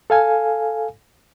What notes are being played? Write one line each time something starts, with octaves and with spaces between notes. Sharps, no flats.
A4 F5 G#5